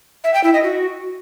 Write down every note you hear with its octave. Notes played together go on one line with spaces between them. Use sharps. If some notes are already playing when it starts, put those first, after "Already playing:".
E5
G5
E4
D#5
F#4